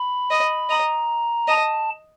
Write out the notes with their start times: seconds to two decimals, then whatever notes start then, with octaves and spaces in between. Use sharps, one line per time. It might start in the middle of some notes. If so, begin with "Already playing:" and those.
Already playing: B5
0.31 D#5
0.69 D#5 A#5
1.48 D#5 A5